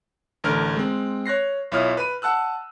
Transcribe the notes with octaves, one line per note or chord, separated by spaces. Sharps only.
A1 D3 A#4 F6
G#3 C4
C#5 F#6 A#6 C7
B1 E4 F4 C#5 D#6 F6
B4 B5 D#7
F#5 A5 E6 F#6